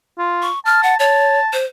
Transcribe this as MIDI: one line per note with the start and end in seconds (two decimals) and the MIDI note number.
0.19 0.47 65
0.42 0.59 85
0.65 0.98 81
0.65 0.81 89
0.83 0.95 78
0.99 1.40 73
0.99 1.54 81
1.53 1.65 72